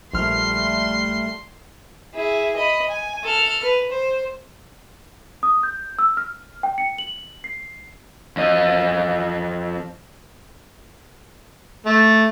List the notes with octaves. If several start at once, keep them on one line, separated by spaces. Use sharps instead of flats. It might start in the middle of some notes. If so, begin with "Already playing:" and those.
A#1 G3 A3 C6 F6
E4 G#4
D#5 B5
G#5
A4 F6
B4
C5
D#6
G6
E6
F6
G5
C#7
F#7
C7
F2 D#5
A3